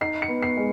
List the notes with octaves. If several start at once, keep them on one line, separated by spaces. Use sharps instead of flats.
D#4 C7
C#7
B3
C7
G#3